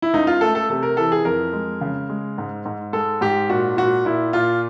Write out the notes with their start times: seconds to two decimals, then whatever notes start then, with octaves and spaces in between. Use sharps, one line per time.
0.02 E4
0.13 C#2 D#4
0.27 F4
0.41 A3 A4
0.55 A4
0.70 C3 A4
0.83 A#4
0.97 E3 A4
1.12 G#4
1.25 F2 A#4
1.53 G#3
1.81 C#3
2.10 G#3
2.38 G#2
2.65 G#2
2.93 G#3 A4
3.21 G#2 G4
3.50 A#2 F#4
3.77 A#2 F#4
4.05 A#2 E4
4.33 A#2 F4